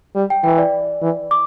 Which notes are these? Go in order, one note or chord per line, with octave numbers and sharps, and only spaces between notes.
G3
G5
E3 G5
D5
E3
D6